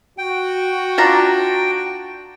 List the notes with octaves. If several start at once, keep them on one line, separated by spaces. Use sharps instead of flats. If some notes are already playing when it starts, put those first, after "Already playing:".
F#4 G5
D4 F4 A#5